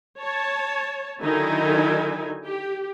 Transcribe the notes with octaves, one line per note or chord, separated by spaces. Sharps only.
C#5 A5
D3 D#3 F#3 D#4 E4 G#5
G4